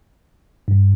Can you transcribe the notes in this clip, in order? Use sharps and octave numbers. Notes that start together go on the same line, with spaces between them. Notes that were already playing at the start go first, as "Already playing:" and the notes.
G2